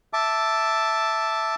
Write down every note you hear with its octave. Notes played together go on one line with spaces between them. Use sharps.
E5 A5 D6